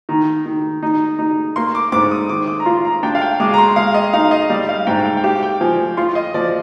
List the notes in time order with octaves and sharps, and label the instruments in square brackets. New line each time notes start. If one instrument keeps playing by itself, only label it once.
[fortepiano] D#3 [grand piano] A#5
[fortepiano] D#3
D#4
D#4
[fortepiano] A#3 [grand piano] C6
[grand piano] D6
[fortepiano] G#2 [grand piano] D6
[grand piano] D#6
[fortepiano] D#3 [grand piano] D6
[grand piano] D6
A#5
[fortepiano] F4 [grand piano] C6
[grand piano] A#5
[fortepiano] D4 [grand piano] G5
[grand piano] F5
G5
[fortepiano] G#3 [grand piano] D6
[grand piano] A#5
C6
[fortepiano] G#3 [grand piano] F5
[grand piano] D#5
[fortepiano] D#4 [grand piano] F5
[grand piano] D#5
[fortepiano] G3 [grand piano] D5
[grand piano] F5
[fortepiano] G#2 [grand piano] G5
[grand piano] G5
G5
[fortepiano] G4 [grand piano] F5
[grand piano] G5
[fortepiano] F3 [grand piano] G#5
[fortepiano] F4 [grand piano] C6
[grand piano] D#5
[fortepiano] F3 [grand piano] D5